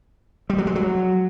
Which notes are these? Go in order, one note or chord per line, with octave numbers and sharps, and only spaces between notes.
G3
F#3
G#3
F#3